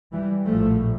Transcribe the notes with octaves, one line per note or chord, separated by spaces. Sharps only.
E3 G3
A#1 A2 F3 A3